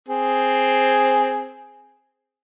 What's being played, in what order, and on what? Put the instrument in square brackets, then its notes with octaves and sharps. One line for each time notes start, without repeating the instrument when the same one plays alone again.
[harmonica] C4 G#4